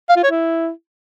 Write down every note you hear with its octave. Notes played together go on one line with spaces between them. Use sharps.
F5
F4
C#5
E4